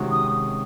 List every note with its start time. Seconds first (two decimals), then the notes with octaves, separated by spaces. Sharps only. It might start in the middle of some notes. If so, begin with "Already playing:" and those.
Already playing: C3 D#3 G#3 C#4 F#4
0.11 D#6